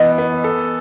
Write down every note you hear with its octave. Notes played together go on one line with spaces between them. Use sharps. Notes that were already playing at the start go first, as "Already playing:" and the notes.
Already playing: E3 B3 D#5
B3
A4